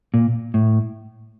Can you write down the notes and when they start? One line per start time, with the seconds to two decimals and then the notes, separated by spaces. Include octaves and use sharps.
0.14 A#2
0.54 A2